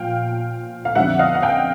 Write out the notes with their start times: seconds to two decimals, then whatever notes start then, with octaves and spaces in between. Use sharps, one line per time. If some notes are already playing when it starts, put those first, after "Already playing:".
Already playing: A#2 F3 F5 G5
0.85 F5
0.95 F2 D3 G3 E5 F#5
1.19 D#5 F5
1.35 F#5
1.42 F5 G5